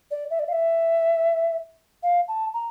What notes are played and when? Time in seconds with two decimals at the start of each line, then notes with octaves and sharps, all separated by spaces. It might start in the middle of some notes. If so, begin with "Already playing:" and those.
0.11 D5
0.30 E5
0.39 D5
0.48 F5
0.53 E5
2.03 F5
2.28 A5
2.54 A#5